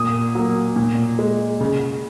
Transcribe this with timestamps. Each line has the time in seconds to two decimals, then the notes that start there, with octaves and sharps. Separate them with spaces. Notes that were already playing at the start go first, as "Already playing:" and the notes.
Already playing: A#2 D#6
0.35 F#3 A#3
0.76 A#2
1.19 G#3
1.60 C#3